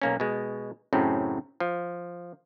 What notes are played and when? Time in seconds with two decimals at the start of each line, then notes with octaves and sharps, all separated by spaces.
0.02 B1 A#3 C#4
0.20 B2 G#3
0.93 F#2 A2 C#3 C4 C#4
1.60 F3